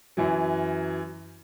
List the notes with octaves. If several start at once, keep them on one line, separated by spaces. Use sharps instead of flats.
F#2 E3 F#3